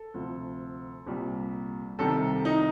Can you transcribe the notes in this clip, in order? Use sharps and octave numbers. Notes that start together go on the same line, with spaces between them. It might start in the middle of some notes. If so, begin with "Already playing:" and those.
Already playing: A4
D2 C3 F3
C2 A#2 G3
C2 C3 D#3 G3 A4
D#4